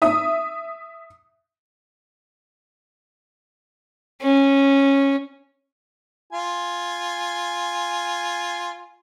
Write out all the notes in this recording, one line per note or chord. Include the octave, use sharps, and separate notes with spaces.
E5 D#6
C#4
F4 G#5